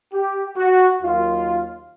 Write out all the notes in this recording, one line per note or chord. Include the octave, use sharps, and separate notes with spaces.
G4
F#4
D#2 D#3 F#3 F4